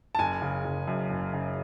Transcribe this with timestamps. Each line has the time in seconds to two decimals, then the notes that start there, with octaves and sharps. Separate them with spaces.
0.15 A5
0.19 F#1 G#5
0.42 C#3
0.65 F#1
0.88 F#2
1.11 F#1
1.34 C#3